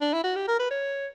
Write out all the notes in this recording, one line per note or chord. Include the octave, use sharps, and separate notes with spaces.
D4
E4
F#4
G4
A#4
B4
C#5